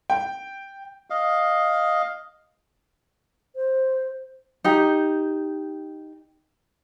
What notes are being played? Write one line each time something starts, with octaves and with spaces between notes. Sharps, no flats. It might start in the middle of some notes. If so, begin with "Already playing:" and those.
G5
D#5 F5
C5
D#4 G4